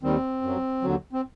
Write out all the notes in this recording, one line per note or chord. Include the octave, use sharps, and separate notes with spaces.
D#2 D#3 G3 C4
F#2
F#3
D#2 D3 F#3
C4